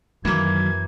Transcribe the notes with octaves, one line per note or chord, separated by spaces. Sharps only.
F#2 D#3 E3 F#3 A#3 G#6